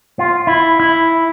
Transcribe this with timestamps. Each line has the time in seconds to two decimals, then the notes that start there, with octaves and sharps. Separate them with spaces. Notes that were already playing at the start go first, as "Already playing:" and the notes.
0.19 F4
0.47 E4
0.80 E4